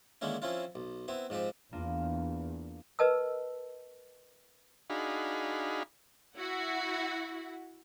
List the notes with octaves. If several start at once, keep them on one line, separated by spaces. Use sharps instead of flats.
D3 D#3 G#3 A#3 C#4 E4
F3 C4 C#4 E4 F4
B1
B3 C4 E4
G#2 F3 C4 G4
E2 A#3 D4 F4
A#4 B4 D#5 A5 E6
D4 D#4 F#4 G#4 F5 B5
E4 F#4 F#5